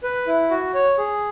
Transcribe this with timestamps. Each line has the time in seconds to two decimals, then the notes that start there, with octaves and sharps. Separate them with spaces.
0.03 B4
0.27 E4
0.50 F#4
0.74 C#5
0.98 G#4